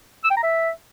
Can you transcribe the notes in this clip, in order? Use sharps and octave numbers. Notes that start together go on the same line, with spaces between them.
E6
G5
A#5
E5